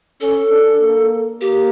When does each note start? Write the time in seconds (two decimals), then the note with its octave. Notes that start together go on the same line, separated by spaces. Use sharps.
0.21 C#4 A4
0.51 D4
0.81 A#3
1.41 A#3 G4